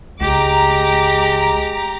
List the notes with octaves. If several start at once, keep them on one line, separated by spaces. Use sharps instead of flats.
C#2 G#3 G4 A#5 D6